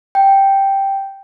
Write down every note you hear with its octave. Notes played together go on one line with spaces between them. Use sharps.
G5